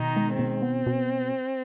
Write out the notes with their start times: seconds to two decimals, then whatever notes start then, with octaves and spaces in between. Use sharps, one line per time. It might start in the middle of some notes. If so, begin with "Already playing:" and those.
Already playing: B2 D#3 D#4
0.17 G#3
0.39 B2 C4
0.62 B3
0.87 B2